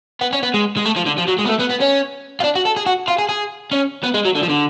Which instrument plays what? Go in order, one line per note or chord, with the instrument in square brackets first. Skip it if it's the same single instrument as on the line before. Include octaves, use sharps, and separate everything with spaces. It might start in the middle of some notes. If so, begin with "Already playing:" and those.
[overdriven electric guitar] B3
C#4
B3
G#3
G#3
A3
F3
D3
F3
F#3
G#3
B3
A3
B3
B3
C#4
F4
D4
F#4
A4
G#4
F#4
F4
G#4
G#4
C#4
B3
G#3
F#3
D3
F3
D3